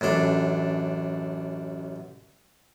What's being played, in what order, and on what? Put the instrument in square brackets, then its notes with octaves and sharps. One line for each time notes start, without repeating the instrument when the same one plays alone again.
[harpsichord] A1 F#2 D4 A4